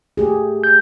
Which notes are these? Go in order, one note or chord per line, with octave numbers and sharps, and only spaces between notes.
A3 G4 G#4
G6